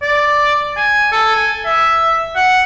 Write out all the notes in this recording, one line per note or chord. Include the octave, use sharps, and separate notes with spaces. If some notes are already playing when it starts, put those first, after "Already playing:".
D5
G#5
A4
G#5
E5
F#5